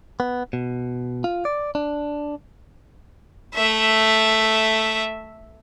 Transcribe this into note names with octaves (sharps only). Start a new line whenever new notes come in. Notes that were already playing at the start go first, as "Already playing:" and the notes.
B3
B2
F4
D5
D4
A3 E5